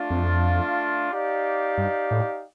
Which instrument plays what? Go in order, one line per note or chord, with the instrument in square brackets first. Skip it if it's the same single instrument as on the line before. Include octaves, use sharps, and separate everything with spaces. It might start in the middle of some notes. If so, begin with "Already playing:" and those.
Already playing: [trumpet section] A3 D4 F4
[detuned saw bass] F2
[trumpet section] D#4 G4 D5 F5
[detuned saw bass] G2
A2